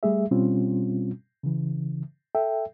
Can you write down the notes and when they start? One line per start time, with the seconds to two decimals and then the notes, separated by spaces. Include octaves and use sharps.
0.03 G3 A3 G#4 E5
0.31 B2 G3 C4 C#4 F4
1.43 C#3 E3
2.35 A4 E5 G5